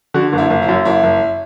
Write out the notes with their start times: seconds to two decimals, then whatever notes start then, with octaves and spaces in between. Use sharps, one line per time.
0.14 D3 F#4
0.33 F#1
0.38 E4
0.50 F#1
0.62 E4
0.68 F#2
0.85 F#1 E4
1.03 F#1